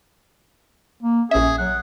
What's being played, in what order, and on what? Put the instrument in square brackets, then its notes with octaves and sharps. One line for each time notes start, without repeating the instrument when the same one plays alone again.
[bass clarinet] A#3
[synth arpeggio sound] A#1 E5 [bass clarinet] C#4 [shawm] G#4
[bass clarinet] F#3 [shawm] F#5